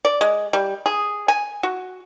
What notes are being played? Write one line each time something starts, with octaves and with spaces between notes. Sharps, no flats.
D5
G#3
G3
G#4
G#5
F#4